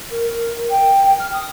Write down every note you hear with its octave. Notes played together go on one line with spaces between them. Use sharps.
A#4
G5
F6
D#6